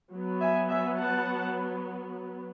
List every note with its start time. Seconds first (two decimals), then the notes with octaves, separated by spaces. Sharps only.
0.13 F#3 B3
0.41 E5 G#5
0.69 E5 G#5
0.98 F#5 A5